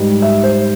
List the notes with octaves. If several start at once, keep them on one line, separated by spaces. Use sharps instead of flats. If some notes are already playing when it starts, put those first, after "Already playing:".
Already playing: G#2 G3
E5
C5